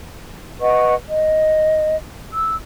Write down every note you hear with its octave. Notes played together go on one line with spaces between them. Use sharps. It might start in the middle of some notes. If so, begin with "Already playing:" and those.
B4 D#5 F#5 C#6
D#5
E6